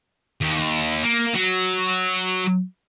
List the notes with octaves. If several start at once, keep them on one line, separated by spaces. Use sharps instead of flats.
D#2
A#3
F#3